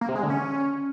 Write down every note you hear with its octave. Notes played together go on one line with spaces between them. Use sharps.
A#3
C3
G#3
D3
C#4